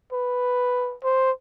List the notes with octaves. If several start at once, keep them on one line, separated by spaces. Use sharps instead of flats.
B4
C5